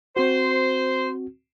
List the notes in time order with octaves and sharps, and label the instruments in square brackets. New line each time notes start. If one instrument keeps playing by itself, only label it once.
[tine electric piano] C4 F#4 [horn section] C5